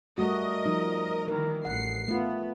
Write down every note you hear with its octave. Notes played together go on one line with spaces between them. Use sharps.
G3 A3 F#4 A#4 D#5
F3 G3 D#4
D#3 E3 A#4
A1 F#5 C7
A3 B3 F4